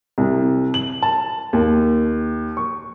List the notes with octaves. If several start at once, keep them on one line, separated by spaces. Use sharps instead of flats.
C2
F#7
A5
D#2
C#6